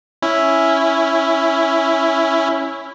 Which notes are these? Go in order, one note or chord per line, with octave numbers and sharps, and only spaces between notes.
C#4 E4